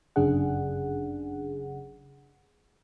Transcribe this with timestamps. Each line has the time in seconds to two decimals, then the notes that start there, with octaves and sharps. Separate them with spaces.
0.16 G1 F#2 C#3 D4 G#4 F#5